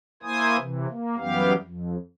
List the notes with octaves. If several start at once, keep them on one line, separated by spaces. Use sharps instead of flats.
A#3 E4 C5 G#5 D#6
C3 E3
A#3
F#2 E3 G3 B3 G4 F5
F2